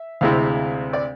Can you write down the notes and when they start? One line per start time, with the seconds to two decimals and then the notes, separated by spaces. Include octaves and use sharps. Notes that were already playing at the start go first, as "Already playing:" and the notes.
Already playing: E5
0.21 D2 C3 G#3 C4 E4 F5
0.93 D5